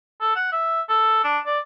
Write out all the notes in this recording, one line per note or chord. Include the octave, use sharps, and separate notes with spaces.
A4
F#5
E5
A4
D4
D5